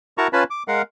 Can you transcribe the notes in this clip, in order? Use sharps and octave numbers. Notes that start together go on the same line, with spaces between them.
E4 F#4 A#4 A5 A#5 C#6
C#4 F4 B4 G#5 A5 B5
D6
G#3 A#4 F5 F#5